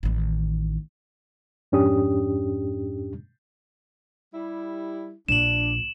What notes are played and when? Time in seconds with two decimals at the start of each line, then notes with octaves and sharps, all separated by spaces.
0.03 A1 D#3
1.72 F2 G#2 C#4 D4 G4 D#6
4.34 G3 E4
5.29 A#1 D4 E7 F#7